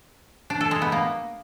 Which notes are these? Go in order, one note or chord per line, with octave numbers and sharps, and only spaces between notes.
D4
A4
G#3
B3
A#3